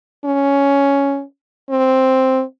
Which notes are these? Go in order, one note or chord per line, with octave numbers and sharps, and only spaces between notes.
C#4
C4